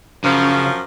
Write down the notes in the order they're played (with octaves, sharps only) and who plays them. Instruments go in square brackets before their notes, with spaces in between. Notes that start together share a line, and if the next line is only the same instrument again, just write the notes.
[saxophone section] F#2 F3 [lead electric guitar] C#3